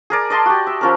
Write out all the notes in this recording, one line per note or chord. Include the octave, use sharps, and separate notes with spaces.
G#4 A#4 D5
D5 D#5 A5 C6
F#4 G4
E5
F3 C#4 A#4